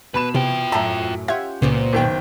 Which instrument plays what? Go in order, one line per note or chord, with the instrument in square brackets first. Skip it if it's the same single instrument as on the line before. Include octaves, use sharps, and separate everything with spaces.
[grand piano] B2 B5 E7 [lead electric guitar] B4
[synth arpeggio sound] C3 [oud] E3 [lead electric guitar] F4 G5
[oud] F#2 A2 F#3 [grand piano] E5 [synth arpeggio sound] A5 A#5
[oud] C#4 F4 [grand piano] G4 F#5 [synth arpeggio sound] E5 G#6
[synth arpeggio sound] C#2 [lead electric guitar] A#2 [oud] B3 C4 F#4
[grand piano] F#1 D#3 G5